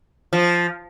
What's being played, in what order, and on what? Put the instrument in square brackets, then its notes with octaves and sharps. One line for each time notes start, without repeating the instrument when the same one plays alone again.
[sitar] F3